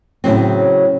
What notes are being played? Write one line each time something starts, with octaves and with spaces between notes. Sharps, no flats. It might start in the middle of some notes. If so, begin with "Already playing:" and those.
A2 C#3 F#3 C4